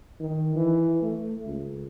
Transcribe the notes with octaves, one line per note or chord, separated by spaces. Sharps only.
D#3
E3
A3
C#2